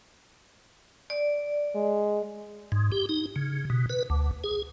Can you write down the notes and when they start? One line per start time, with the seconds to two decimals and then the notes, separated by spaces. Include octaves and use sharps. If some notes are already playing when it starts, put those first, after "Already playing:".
1.10 D5
1.75 G#3
2.72 G#2
2.92 G4
3.09 D#4
3.36 C#3
3.70 B2
3.90 B4
4.10 D2
4.44 G#4